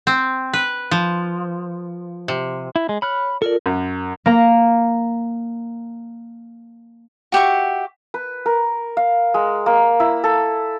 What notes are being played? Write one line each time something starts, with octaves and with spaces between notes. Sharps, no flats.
C4
B4
F3
C3
E4
G#3
C#5 B5 F6 F#6
F4 A4 A#4 D5
F#2
A#3 A#5
F#4 G4 E5 C#6
B4
A#4
F5
G#3
A#3
E4
A4